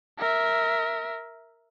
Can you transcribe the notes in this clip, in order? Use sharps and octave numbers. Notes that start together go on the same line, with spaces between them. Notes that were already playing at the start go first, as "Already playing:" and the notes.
A#4 E5